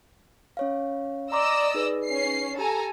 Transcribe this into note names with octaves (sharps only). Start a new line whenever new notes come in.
C#4 C#5 F5
D5 D#5 A#5 C6 D6 E6
D#4 G#4 B4
C#4 C7
G4 A4 G#5 A#5